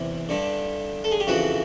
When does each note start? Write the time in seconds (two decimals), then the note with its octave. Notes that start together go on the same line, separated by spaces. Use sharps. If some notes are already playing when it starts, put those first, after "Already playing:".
Already playing: E2 C3 E3 E4
0.29 G2 D3
1.04 A4
1.11 G#4
1.20 G4
1.27 F2 C#3 E3 F#4